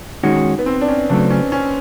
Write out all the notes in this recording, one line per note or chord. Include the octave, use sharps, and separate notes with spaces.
D#3 G#3 C#4 D#4 F#4
B3
C4
D4
C#4
C#3 F#3 A3 D4
C#4
C#4